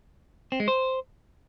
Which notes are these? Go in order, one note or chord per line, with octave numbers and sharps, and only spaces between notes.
C4
G#3
C5